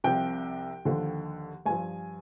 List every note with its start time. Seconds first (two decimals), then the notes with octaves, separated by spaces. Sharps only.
0.04 C2 C3 F3 G5
0.85 D#2 D3 F3
1.66 G2 F3 G#5